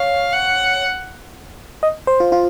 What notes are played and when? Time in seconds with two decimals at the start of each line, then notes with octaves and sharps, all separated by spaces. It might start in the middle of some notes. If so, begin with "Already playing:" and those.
Already playing: C#5 F5
0.33 F#5
1.83 D#5
2.07 C5
2.20 F4
2.32 F4